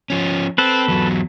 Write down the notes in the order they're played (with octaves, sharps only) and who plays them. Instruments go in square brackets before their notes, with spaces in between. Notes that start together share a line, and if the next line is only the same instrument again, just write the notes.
[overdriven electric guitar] F3 C#4
[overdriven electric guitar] C4 [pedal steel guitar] A4 B4
[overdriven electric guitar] E2 F#3